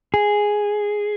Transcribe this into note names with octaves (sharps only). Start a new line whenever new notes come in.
G#4